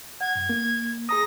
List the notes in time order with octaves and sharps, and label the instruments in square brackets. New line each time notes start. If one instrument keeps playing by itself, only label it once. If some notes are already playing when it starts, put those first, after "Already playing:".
[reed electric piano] F#5 [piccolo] G#6
[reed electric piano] F#2
A#3
[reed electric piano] G#4 A#5 D#6 [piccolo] A#6